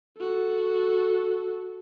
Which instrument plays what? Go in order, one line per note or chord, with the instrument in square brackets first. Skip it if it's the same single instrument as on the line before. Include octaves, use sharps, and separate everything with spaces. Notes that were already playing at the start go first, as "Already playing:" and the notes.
[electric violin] F#4 A4